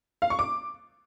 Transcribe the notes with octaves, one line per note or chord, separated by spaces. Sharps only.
F5
C#6
D6